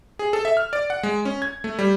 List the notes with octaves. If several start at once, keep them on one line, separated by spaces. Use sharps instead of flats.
G#4
A4
E5
F6
D5
F#5
G#3
C#4
G#6
A3
G3